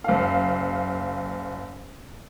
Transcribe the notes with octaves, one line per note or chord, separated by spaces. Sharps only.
F#1 F5